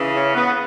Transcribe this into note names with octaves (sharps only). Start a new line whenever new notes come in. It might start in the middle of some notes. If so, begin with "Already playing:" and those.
Already playing: C#3 E3
C#4
B3